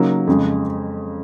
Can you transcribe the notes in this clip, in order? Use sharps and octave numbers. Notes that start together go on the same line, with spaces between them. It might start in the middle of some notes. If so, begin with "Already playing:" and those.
Already playing: C#3 F#3 A#3 D#4
F2 C#3 G#3